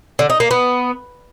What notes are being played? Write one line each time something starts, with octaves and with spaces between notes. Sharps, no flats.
D3
D#4
A#3
B3